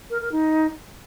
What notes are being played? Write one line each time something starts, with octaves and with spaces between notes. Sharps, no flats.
A#4
A#4
D#4